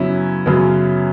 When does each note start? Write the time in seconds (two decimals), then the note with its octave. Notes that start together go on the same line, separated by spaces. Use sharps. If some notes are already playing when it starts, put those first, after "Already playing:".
Already playing: F#2 C#3 F#3 B3 C#4 E4
0.46 F#2 C#3 F#3 B3